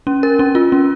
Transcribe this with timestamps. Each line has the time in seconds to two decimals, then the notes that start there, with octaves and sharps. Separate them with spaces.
0.07 C#4
0.23 A#4
0.39 C#4
0.55 F4
0.72 C#4